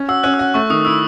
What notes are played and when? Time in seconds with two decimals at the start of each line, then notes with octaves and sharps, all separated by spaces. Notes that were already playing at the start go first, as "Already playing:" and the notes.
Already playing: C#4
0.09 F#4 E6
0.23 C#4 F#6
0.34 E6
0.39 F#4
0.54 A3 C#6
0.70 D#3 D#6
0.85 E4 E6